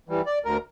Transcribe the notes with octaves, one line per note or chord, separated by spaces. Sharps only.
E3 G3
D5
D2 A#4